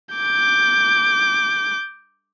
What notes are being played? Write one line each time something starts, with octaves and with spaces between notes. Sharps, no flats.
D6 G6